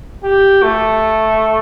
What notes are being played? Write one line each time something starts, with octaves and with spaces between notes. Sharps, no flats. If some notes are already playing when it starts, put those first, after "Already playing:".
G4
A3